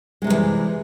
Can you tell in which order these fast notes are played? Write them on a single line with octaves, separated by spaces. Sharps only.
G#3 C3 G3 A2 E3